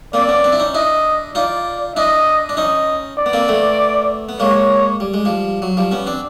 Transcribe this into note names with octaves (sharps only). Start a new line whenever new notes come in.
A#3 C4 D5
B3 C#4
C4 D4
E4
C#4 D#4
D4 E4 D#5
D#4 F4 D5
D4 E4 D#5
D4
C#4 D#4 D#5
D5
B3
A#3 C4
A3 B3
B3
G#3 A#3 C#5
G3
G#3
F3 G3
F#3
F3 G3
B3 C#4
C4 D4